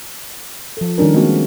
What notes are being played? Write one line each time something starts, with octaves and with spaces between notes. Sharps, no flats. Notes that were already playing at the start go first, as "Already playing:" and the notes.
F3 A4
D#3 G3 C#4 D4 A#4
G#3 A#3 C4 F#4